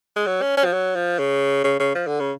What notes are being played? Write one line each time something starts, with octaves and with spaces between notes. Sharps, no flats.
G#3
F#3
C#4
C#4
F3
F#3
F3
C#3
C#3
C#3
F3
D3
C#3